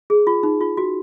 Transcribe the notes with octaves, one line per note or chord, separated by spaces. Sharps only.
G#4
F4
D#4
F4
F#4